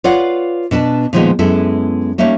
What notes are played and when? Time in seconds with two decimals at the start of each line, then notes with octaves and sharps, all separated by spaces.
0.04 F4 B4 C#5 D5 F5 F#5
0.71 B2 D4 B4 A5
1.13 A#2 D#3 F3 G#3 B3 D#4
1.39 F#2 G#3 B3 E4 A4
2.18 G3 A3 A#3 C#4 D#4 C#5